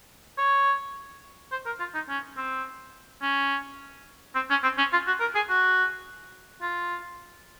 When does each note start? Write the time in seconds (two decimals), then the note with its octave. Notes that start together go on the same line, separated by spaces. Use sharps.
0.38 C#5
1.52 C5
1.66 A#4
1.80 F4
1.94 D#4
2.09 C#4
2.37 C4
3.22 C#4
4.35 C4
4.50 C#4
4.63 C4
4.78 C#4
4.93 F4
5.07 F#4
5.20 A#4
5.35 G#4
5.49 F#4
6.62 F4